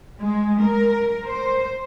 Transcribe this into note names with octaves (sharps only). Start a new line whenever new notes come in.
G#3
A#4
C5